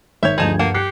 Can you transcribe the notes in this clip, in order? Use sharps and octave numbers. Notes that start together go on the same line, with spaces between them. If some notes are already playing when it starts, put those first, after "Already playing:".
G#1 C#5 E5 G6 G#6
D2 G2 F3 D#4 G#4 A5 A#5 G#6
A#3 F#5 A5
G4 F#6 C7 C#7